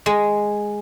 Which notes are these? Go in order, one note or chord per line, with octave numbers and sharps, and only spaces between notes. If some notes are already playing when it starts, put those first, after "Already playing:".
G#3